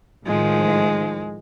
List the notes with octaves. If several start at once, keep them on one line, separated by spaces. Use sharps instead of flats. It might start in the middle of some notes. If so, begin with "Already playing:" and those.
A2 D#3 F3 G#3